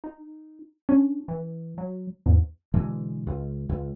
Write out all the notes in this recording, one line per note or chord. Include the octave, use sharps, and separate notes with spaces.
D#4
C#4 D4
E3
F#3
E2 G#2
B2 D3 E3 G#3
C#2
C#2